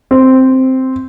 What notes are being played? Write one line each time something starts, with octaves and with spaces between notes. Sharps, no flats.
C4